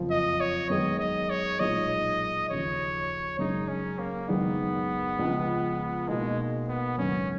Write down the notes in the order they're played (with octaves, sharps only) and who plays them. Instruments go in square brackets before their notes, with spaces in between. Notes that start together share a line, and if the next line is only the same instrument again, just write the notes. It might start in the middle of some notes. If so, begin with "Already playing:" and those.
Already playing: [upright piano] F#1 F2 F3
[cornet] D#5
C#5
[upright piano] F#2 D#3 G#3 B3 [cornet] D#5
[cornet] D#5
C#5
[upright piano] B1 A#2 G#3 D#4 [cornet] D#5
[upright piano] D#2 C#3 F3 [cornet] C#5
[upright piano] F#2 C#3 G#3 [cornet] D#4
[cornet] C#4
A#3
[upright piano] F#1 F#2 D#3 G#3 D#4 [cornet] B3
[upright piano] C#2 C#3 F3
[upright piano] B2 A#3 D#4 [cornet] G#3
[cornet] B3
[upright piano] G#1 F#2 C#3 [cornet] C#4